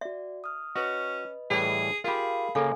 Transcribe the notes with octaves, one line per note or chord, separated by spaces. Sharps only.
F#4 D5 E5
D#6 F6
C#4 F#4 B4 D#5
A2 E3 G3 G#4
F4 G4 G#4 A#4 F5 B5
C#3 A#3 G#4 A4 F5 G#5